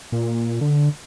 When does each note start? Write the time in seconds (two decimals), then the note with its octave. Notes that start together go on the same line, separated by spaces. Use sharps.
0.12 A#2
0.61 D3